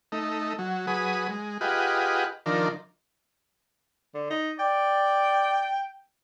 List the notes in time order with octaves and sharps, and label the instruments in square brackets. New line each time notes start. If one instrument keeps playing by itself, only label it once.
[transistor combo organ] A3 D#4
F#3
F#3 G#4 B4 D#6
G#3
F4 G4 G#4 B4 D#5 F#5
D#3 F3 D4 A#4
[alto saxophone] D3
D#4
[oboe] D5 [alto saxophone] G5